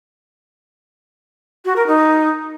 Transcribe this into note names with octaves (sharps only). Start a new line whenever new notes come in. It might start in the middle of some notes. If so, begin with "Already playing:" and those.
F#4
A#4
D#4